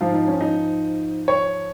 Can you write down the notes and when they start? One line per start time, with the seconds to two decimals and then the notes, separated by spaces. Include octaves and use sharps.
0.01 G#2 F3 F4
0.14 D#4
0.28 C#4
0.41 D#4
1.28 C#5